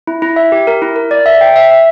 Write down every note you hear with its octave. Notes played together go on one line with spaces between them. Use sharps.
E4
E4
E5
G4
A#4
E4
A#4
D5
E5
G5
E5
E5